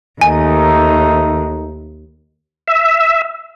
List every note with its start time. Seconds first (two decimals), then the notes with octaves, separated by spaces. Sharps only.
0.21 D#2 D#3 A3 D#4 G#5
2.68 E5